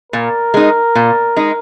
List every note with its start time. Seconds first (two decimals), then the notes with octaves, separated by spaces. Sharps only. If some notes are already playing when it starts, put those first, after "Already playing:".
0.12 A#2 A#4
0.54 G#3 D#4
0.95 A#2
1.36 G#3 D#4